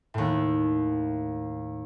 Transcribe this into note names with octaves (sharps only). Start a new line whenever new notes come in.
D#2 A2